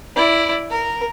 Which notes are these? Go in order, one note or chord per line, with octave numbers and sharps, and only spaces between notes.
E4 D5
A#4